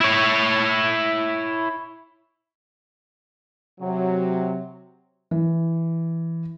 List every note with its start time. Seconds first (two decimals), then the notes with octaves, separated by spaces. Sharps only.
0.01 E4 C#5
3.81 C3 F#3
5.31 E3